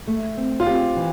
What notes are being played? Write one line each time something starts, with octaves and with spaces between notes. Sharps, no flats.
A3
C4
F4
C4 G4
E3